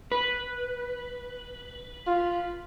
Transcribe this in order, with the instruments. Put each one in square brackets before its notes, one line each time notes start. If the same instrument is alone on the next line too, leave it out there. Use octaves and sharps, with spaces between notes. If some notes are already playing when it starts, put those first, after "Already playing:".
[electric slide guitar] B4
[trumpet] F4